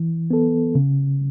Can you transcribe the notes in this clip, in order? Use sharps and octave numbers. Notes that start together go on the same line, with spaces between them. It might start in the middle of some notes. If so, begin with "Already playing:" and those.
Already playing: E3
B3 A4
C#3